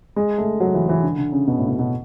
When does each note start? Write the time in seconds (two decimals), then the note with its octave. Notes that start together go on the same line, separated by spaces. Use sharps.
0.16 G#3
0.38 A3
0.60 F#3
0.74 E3
0.89 E3
1.03 D3
1.18 D3
1.32 C#3
1.47 B2
1.58 A2
1.68 B2
1.79 B2